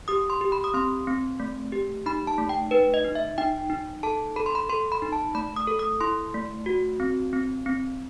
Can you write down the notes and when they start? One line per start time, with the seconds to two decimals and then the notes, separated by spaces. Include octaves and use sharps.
0.08 G4 D#6
0.30 C6
0.41 G4
0.52 B5
0.64 D#6
0.74 C4 C6
1.07 C4
1.40 A3
1.72 G4
2.06 D#4 B5
2.27 A5
2.38 A3
2.49 G5
2.71 D#4 B4
2.94 D#5
3.05 D#4
3.15 E5
3.38 D#4 G5
3.70 D#4
4.03 A4 A5
4.36 A4 B5
4.46 C6
4.55 B5
4.69 A4 C6
4.92 B5
5.02 D#4
5.12 A5
5.35 A3 B5
5.56 D#6
5.67 A4
5.79 D#6
6.00 E4 C6
6.34 A3
6.66 F#4
7.00 C4
7.33 C4
7.66 C4